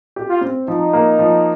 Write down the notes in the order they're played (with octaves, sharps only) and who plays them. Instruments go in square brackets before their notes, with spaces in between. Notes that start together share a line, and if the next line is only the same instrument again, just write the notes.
[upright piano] G4
[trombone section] F4
[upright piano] C4
[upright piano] F3 [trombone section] D#4
[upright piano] A#3
F3